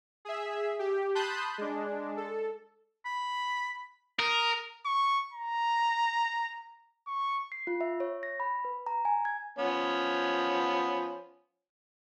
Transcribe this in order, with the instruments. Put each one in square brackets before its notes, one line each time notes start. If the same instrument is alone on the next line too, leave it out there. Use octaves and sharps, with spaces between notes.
[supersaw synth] G#4 E5
G4
A5 B5 C6 D#6 F#6 G6
G#3 D4
A4
[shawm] B5
[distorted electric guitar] A#4 [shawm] D#6
[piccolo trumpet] C#6
A#5
C#6
[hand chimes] C7
F4
E5
C#5
A#6
B5
B4
A#5
G#5
G#6
[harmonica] F3 B3 C#4